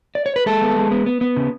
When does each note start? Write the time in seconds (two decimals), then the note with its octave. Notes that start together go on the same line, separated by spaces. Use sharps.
0.15 D5
0.26 C#5
0.36 B4
0.46 G#3 A4
0.62 B3
0.76 G#3
0.91 B3
1.06 B3
1.21 B3
1.36 C#3